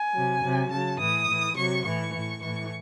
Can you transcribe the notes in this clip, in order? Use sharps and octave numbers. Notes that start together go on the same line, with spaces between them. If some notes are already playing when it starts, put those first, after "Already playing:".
Already playing: G#5
C3 F#3
C3 F#3
C#3 F#3 A5
A2 E3 D#6
A2 E3
C3 F#3 C#6
A2 E3 C#6
A2 E3
A2 E3 C#6